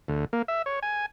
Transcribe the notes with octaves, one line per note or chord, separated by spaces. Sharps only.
D2
A#3
E5
C#5
G#5